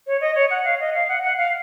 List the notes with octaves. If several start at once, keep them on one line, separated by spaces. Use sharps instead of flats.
C#5
D#5
C#5
F#5
F5
D#5
F5
F#5
F#5
F5